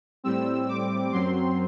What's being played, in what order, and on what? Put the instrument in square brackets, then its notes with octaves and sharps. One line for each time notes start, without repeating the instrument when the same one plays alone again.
[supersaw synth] A2 G3 C4 E6
D6
F#2 F#3 C4 C6